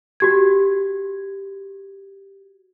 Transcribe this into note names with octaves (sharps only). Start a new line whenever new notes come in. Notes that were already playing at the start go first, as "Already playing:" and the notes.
F#4 G4 G#6